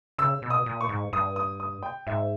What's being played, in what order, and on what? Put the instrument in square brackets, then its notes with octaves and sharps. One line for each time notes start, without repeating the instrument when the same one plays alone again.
[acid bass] C#3 [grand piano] E6
[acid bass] B2
[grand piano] D#6
[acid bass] A#2
[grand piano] C#6
[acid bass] G#2
[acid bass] G2 [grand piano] D#6
[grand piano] D#6
D#6
G5
[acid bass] G#2 [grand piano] E5